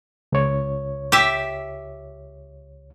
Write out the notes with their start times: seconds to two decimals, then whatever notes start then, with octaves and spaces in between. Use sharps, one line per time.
0.32 C#2 C#5
1.12 G4 E5